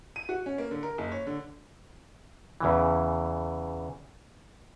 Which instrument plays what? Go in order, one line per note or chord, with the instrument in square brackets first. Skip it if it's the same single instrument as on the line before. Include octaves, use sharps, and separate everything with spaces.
[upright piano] D#7
F#4
C#4
A#3
D3
A#4
F#1
C#5
D3
[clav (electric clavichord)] E2 C#3 E3